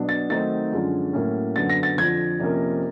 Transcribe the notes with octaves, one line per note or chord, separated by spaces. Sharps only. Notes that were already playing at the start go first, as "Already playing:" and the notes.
Already playing: B2 F#3 B3 D4
A6
D#3 F#3 A3 C4 D#4 A6
F#2 D3 F3 G#3 C#4
A2 F#3 A#3 C#4
F#2 D3 F#3 B3 A6
A#6
A6
F2 D3 F3 G#6
F2 C3 F3 A#3 C#4